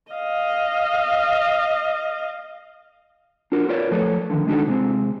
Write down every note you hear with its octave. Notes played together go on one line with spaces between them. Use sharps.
D#5 F5
D4 F4 F#4 A#4
F4 A#4 B4 C#5 D5
F3 F#3 A3 A4 B4 C#5
D3 D#3 F3
G#3 B3 D4 D#4 F#4 A4
C3 G#3 C4